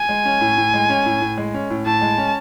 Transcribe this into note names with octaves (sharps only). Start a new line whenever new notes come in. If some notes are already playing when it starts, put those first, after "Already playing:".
Already playing: G#5
G#3
C#4
A2
A2
G#3
C#4
A2
A2
G#3
C#4
A2
A2 A5
G#3
C#4